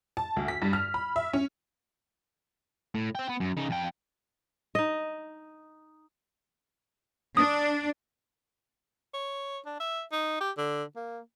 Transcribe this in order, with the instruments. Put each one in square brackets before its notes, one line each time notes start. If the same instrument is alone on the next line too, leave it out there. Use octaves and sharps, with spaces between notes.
[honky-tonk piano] A5
D2
B6
G2
F6
B5
E5
C#4
[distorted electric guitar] A2
C5 G5
B3
F#2
C#3 D#4
F2 G5
[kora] D#4 D#5
[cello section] D4 [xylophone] D#6
[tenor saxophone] C#5
D4
E5
D#4
G4
D3
A#3